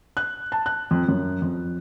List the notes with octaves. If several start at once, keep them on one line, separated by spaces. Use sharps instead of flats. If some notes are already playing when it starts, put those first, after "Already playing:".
F#6
A5
F#6
F2
F#2
F2